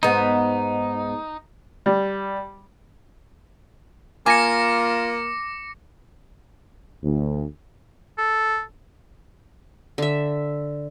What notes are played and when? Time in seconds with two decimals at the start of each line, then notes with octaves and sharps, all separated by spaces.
0.03 G#2 B3 D#4
1.86 G3
4.26 A#3 F4 G#5 D6 A#6 C#7
7.04 D2
8.18 A4
9.98 D3 E5